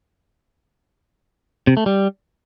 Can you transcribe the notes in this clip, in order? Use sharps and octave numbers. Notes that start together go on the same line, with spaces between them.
C3
A3
G3